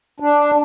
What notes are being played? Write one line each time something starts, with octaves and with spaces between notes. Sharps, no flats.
D4